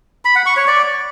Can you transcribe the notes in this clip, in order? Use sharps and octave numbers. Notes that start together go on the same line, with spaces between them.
B5
F#5
C#6
C#5
D5